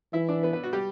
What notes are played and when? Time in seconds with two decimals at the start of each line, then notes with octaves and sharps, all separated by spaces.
0.13 E3 E4 E5
0.28 D4 D5
0.43 B3 B4
0.53 B3 B4
0.63 F#4
0.73 G3 G4